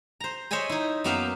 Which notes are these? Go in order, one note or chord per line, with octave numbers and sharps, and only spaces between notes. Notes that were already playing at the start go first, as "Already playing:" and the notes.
C5 A#5
C5 C#5 D#5 E5 G#5 B5
D#4 E4
F#2 A#3 B3 E5 F5 G5